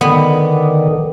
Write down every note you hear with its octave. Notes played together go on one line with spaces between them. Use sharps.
D3 D#3 B3